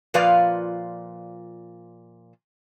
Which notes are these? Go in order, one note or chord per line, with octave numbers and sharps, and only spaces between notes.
A#2 F3 F4 B4 D5 F5